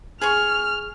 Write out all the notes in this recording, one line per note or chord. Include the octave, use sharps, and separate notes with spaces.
G#4 G#5 C#6 F6